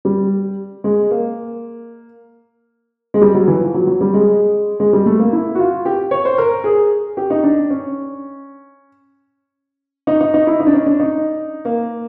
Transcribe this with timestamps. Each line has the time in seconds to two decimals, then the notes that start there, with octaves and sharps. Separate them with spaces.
0.05 G3
0.84 G#3
1.11 A#3
3.14 G#3
3.21 G3
3.35 F#3
3.48 E3
3.61 F3
3.74 F#3
3.87 F#3
4.01 G3
4.14 G#3
4.80 G#3
4.93 G3
5.06 A3
5.19 A#3
5.33 E4
5.55 F#4
5.59 F4
5.85 G4
6.11 C#5
6.25 C5
6.38 A#4
6.64 G#4
7.17 G4
7.30 D#4
7.43 D4
7.70 C#4
10.07 D#4
10.21 D#4
10.34 D#4
10.47 E4
10.60 D#4
10.67 D4
10.73 C#4
10.86 D4
11.00 D#4
11.65 A#3